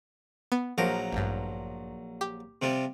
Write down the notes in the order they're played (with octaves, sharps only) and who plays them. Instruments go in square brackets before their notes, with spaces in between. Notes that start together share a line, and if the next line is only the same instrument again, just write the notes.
[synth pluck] B3
[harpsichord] A#1 F#3 A#4 [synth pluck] F3
[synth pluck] A1 G2
G4
[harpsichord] C3 F3 G3